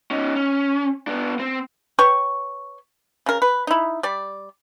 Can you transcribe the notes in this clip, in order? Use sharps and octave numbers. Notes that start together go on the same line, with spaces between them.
C#4 D#4
C#4
B3 D4
C4
B4 C#5 G5 C#6
C#3 A#4
B4
D#4 E4
G3 D5